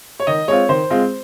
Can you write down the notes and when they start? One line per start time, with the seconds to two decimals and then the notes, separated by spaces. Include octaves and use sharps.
0.20 C#5
0.27 D#3 D#5
0.48 G#3 C4 F4 C#5
0.69 D#3 C5
0.90 G#3 C4 F4